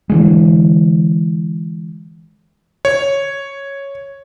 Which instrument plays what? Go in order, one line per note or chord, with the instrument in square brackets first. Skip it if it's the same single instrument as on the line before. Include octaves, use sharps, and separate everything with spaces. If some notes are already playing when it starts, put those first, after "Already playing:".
[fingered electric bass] D3 E3 G#3
[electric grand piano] C#5